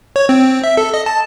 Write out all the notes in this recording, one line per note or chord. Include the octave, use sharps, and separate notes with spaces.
C#5
C4
E5
A4
D#5
A5